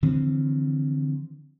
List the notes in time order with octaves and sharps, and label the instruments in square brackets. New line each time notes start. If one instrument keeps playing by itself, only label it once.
[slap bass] D3 E3 F3 C4